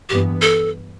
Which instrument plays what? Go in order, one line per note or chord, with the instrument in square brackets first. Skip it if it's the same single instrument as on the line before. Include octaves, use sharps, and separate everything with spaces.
[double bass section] G2 E3 B3 [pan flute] G4
[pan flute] A4